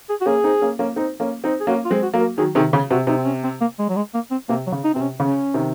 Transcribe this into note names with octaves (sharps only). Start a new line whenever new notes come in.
G#4
F#4
A#3 C#4 G#4
C4 D#4
A#3 C#4
A#3 C#4
C4 D#4
A#3 C#4
C4 D#4
G#4
A#3 C#4 F#4
F4
G#3 C4
F#4
F#3 A#3
A#4
D#3 F#3 G#4
C3 D#3 G#4
C#3 G#4
C3 F#4
C3 D#4
C4
C#4
C4
A#3
G#3
F#3
G#3
A#3
C4
C3 A#3
F#3
C#3
D#4
C3 C4
C#4
C#3 C#4
C3 D#3